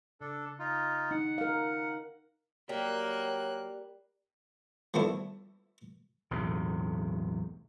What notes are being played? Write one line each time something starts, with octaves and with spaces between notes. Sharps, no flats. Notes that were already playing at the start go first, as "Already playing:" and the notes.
C#3 D4 A4
D#4 F4
D#4 F#5
A#4 F5
F#3 G3 A#3 F#6
F3 G3 A3 B3 D4 E4
B1 E2 A2 C3